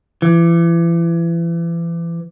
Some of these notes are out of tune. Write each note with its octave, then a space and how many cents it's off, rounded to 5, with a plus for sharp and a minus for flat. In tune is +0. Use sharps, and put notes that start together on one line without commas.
E3 +35